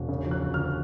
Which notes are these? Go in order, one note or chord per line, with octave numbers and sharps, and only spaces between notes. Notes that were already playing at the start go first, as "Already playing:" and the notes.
Already playing: E1
C#3
F3
F#6
D2
F6
F3